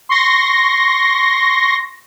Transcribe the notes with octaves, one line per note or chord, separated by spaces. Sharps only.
C6 C#6 A#6